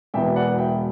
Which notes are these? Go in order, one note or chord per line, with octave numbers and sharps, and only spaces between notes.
E1 E2 B2 E5 G5
D5 F#5
E5 G5